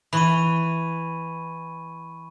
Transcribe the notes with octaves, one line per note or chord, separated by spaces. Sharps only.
E3 B5 C#6 D#7